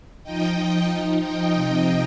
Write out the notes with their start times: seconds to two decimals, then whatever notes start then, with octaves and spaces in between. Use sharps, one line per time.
0.23 F3 D#4 D#5 G5
0.89 F3 D#4
1.21 D#5 G5
1.54 C3 F3 D#4 D#5 G5